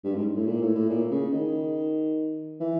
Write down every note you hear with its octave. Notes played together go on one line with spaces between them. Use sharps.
G2
G#2
A2
A#2
A2
A2
A#2
C#3
D#3
E3